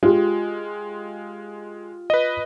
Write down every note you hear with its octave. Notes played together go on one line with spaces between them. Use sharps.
G#3 F4 G4
B4 D#5